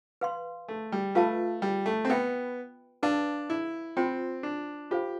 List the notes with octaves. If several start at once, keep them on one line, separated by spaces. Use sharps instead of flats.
B4 F5 C6
A3
G3
A3 F4 B4 F5 A5
G3
A3
C4
B3 B4 E5 G5 B5
D4 B4 F5 A5
E4
C4 F4 C5 G5 C6
D4
F4 G4 A4 C5 F5